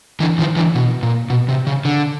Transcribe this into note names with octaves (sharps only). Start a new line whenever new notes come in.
D3 E3
D#3 F3
D3 E3
B2
A#2
B2
C3
C#3
D3